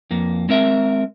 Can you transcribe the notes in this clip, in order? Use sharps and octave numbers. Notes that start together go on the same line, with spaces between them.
F2 A#3
G#3 C4 A#4 E5